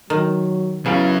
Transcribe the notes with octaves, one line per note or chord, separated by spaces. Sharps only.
D#3 F#3
C#3 F#3 B3 C#4 E4 F5